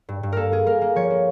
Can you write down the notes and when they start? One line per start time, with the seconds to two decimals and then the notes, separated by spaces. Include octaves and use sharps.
0.09 G2
0.23 G2
0.32 A#3 A4 A#4
0.52 A#3 G#4
0.67 A#3 A#4
0.82 A#3
0.95 F3 C#5
1.10 A#3